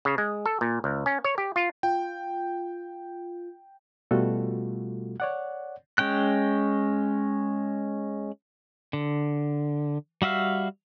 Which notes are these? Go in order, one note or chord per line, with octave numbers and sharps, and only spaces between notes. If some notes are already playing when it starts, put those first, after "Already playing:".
C#3
G#3
A4
A#2
C#2
C#4
C#5
G4
F4
F4 G5
B2 G3 A3 F4 F#4 A4
C#5 D5 F#5
G#3 C#4 G5 F#6
D3
G3 F#4 E5 F5